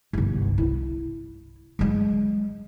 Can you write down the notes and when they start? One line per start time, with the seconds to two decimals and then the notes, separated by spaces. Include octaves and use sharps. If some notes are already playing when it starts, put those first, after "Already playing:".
0.13 G1 C2
0.58 E4
1.79 F#3 G#3